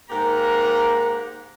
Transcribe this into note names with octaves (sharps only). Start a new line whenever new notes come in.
G#2 A#3 G4 A#4 F#5 A#5